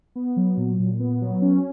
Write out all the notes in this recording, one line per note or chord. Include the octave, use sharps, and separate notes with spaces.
B3
F#3
A#2
A#2
B3
F#3
C#4